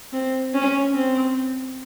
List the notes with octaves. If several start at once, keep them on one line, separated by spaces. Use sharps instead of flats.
C4
C#4
C4